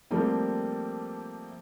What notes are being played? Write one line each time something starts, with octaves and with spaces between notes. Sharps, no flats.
F3 G3 A3 A#3 C4